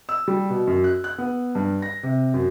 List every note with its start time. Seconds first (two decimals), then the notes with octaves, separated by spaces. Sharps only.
0.09 E6
0.28 G3
0.50 B2
0.67 F#2
0.84 F#6
1.04 F#6
1.18 B3
1.55 G2
1.82 A#6
2.03 C3
2.34 F#2